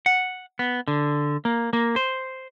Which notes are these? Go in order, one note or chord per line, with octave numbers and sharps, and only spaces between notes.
F#5
B3
D3
A#3
A#3
C5